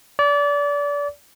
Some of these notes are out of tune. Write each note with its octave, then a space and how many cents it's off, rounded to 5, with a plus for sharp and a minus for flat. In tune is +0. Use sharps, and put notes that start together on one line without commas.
D5 -30